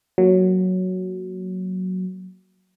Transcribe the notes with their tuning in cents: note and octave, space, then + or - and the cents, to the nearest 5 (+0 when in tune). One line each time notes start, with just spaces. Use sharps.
F#3 +0 A#3 +0